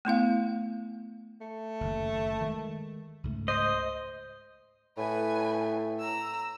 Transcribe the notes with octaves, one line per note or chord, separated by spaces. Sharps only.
A3 B3 E4 F5
A3
F#1 D#2
D#3 G#3
C#2 G#2 A3
C5 D#5
A2 B4 G#5
A#5 E6